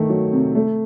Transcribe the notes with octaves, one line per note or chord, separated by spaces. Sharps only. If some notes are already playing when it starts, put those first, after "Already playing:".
Already playing: D#3 A3
F#3
C3
A3